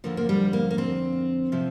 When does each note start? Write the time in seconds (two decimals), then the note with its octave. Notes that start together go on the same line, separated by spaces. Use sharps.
0.04 F2 D3 F3 A#3
0.17 A#3
0.29 G3
0.53 A#3
0.71 A#3
0.78 C4
1.52 C3 F3